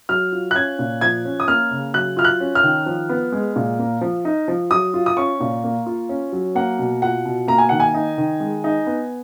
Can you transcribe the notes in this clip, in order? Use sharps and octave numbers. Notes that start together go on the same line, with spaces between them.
F#3 F6
F4
F#6
C#4 G#6
A#2
F3 G#6
C#4
D#6
A#3 F6
C#3
F#3 F#6
F4 F6
F#6
C#4
F6
D#3
F3
B3
G#3
A#2
A#3
F3
D#4
F3
F#3 D#6
F4
D#6
C#4 C#6
A#2
A#3
F4
C#4
F#3
A#3 F#5
B2
F4 F#5
B2
A#3 A#5
G#5
D#3 F#5
G#5
D#4
D#3
G#3
D#4
B3